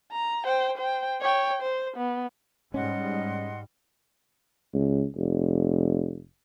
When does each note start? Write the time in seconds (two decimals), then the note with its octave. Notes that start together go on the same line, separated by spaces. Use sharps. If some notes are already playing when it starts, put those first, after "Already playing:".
0.12 A#5
0.45 C5 G5
0.78 C5 G5
1.21 C#5 G5
1.62 C5
1.97 B3
2.74 G#2 G3 C#4 D#5 F#5 C6
4.73 C#2
5.16 F1